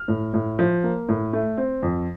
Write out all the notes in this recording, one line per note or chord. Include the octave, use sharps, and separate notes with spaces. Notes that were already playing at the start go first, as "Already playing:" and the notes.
Already playing: F6
A2
A2
F3
A#3
A2
A3
C4
F2